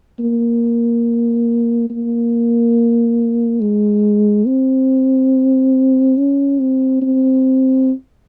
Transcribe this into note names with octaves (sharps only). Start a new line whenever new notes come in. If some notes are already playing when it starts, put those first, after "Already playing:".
A#3
A#3
G#3
C4
C#4
C4
C4